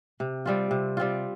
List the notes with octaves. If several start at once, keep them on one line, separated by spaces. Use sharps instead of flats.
C3
G3 C4 F4
C3
G3 C4 F4